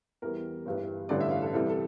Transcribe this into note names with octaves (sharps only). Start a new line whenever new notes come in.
E2 E3 G3 A#4
G1 G2 E3 G3
A1 G2 D3 G3 D5
E5
F5
A4
C2 C3 E3 G3 A4
A4